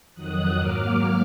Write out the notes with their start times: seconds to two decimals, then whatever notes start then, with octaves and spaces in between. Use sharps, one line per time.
0.14 F2 D#3 F#3 D#6 F#6
0.57 G#2 F#3 A#3 D6 F6